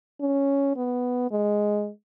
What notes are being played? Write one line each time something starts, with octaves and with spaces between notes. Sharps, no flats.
C#4
B3
G#3